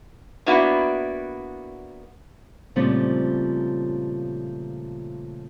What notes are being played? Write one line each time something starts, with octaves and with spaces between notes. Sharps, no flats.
A#3 B3 D4 E4 F#4
A#2 C#3 F3 G3 A3 C4